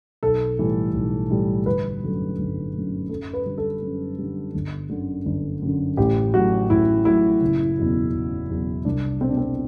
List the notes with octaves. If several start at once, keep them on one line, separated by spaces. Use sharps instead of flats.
B1 A4
A2 E3 G3
B1
A2 E3 G3
G1 B4
F#2 D3 F#3 A3
G1
F#2 D3 F#3 A3
F#2 A4
B4
D3 G3
A4
F#2
D3 G3
G1
F#2 D3
G1
F#2 D3
A1 G4
A2 F#3 F#4
A1 E4
A2 F#3 E4
F#1
E2 B2 F#3
F#1
E2 B2 F#3
C2 D4
B2 A3 C4
D4
C4